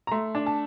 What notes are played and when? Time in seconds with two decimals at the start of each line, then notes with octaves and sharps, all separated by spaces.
0.07 A#5
0.11 A3 C6
0.35 D4
0.46 A5